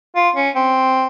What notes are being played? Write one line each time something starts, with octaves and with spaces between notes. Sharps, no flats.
F4
C#4
C4